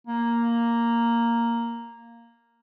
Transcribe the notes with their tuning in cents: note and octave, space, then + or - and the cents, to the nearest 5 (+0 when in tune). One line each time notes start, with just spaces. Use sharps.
A#3 +0